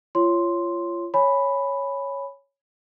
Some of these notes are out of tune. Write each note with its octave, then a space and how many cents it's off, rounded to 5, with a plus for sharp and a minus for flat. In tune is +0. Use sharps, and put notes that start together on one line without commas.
F4 -25 C#5 +0 C6 +0
C#5 +0 G#5 +5 B5 +0